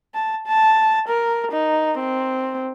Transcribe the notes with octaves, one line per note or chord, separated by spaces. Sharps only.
A5
A5
A#4
D#4
C4